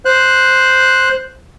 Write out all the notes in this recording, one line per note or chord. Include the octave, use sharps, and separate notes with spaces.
C5 F#6